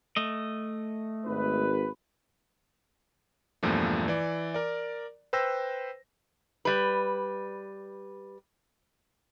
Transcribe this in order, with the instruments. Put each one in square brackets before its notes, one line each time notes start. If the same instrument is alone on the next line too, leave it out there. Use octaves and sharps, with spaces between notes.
[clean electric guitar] A3 D#5
[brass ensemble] G#1 B4
[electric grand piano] E2 G2 A#2 F3 A3
E3 D5
A#4 D5
B4 C5 G5 E6 A#6
[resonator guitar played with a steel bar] G3 B4